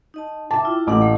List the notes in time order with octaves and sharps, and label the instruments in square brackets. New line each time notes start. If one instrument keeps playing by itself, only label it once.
[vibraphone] D#4 D#5 A5
[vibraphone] E5 G5 D6 [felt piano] A5
[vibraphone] E4 F4
[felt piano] A1 D6 [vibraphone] A#3 F#5
[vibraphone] A3 F5